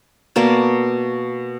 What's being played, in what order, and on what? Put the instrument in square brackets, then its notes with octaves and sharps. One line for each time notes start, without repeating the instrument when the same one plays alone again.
[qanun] B2 A#3 D5 A5